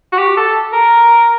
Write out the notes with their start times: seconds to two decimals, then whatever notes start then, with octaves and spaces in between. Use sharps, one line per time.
0.12 F#4
0.18 G4
0.37 A4
0.73 A#4